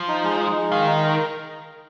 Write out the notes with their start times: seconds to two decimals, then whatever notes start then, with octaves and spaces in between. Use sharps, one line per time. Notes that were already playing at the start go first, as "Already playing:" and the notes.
Already playing: F3
0.08 D#4
0.24 G#3
0.40 D#4
0.56 G#3
0.71 D#3 F5
0.87 D#4
1.03 A#4